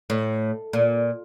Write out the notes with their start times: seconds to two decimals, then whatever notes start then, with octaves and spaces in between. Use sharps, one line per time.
0.10 A2
0.73 A#2